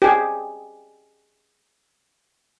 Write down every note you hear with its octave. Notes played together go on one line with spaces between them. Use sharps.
G4 G#4